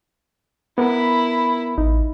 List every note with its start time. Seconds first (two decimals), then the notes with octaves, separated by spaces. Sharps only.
0.78 B3 E4 A#4 B5
1.78 A1 D#4